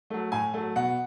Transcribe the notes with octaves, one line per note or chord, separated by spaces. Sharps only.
F#3 A3
A2 G#5
F#3 A3
B2 F#5